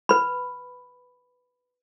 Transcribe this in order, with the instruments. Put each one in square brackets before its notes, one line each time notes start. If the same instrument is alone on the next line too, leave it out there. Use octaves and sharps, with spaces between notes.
[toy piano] B4 B5